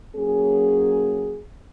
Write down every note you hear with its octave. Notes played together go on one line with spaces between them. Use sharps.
F#3 A#3 C#4 G#4